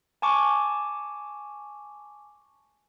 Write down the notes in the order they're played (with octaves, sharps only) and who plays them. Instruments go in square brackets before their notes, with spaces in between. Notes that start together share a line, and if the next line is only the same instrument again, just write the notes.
[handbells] G#5 A5 C#6 D6